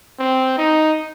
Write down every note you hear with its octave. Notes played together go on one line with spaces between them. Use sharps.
C4
D#4